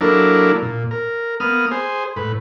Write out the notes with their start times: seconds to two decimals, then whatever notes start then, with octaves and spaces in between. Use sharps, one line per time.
0.01 F#3 A#3 D4 E4 A4 A#4
0.62 A#2
0.91 A#4
1.40 A#3 B3 D#6 F6
1.71 G#4 C5
2.16 A2 B4